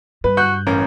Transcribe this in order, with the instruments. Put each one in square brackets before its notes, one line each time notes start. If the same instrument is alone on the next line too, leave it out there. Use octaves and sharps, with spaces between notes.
[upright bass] G2 [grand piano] B4
[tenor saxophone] F#4 [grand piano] F#6 [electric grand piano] G6
[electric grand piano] A1 C#4 A#5 [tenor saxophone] A#3